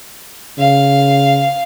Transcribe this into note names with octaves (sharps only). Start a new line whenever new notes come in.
C#3 F5